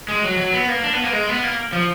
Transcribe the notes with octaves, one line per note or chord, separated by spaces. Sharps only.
G#3
F#3
F#3
B3
A#3
D4
B3
A#3
G#3
B3
A#3
F3